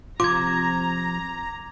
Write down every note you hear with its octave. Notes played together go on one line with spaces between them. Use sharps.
C3 F3 F4 A#5 D6 G#6